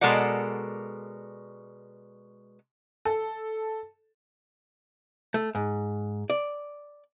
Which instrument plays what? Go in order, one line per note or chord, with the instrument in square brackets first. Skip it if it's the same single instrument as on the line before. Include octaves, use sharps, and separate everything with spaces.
[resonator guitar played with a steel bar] B2 G#3 A4 A#4 D5 F#5
[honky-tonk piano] A4
[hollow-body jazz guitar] A3
G#2
D5